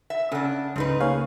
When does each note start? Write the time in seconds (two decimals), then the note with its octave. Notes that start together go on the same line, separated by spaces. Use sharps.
0.10 E5
0.32 C#3 C#4 D4 A4 F#5
0.76 C#2 G#2 C#3 D#4 B4
1.00 A#3 G#4 C#5 F5